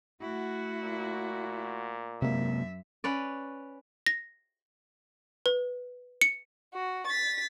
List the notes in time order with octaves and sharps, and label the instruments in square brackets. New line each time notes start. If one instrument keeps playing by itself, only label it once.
[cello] A3 E4 [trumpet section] F#4
[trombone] A#2
[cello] F#2 E5 [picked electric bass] C3 G#3 A#3
[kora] C#4 B4 D5
[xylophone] A#6
B4
C#7
[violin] F#4
A6 B6